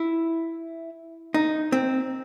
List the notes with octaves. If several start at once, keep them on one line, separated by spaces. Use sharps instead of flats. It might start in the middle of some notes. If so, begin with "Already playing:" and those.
Already playing: E4
D#4
C4